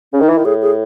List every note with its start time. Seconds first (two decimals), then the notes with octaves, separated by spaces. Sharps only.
0.13 C#3 C#4
0.20 D#3
0.23 D#4
0.29 E3
0.34 D#3 E4
0.45 A2 G#4
0.62 G#4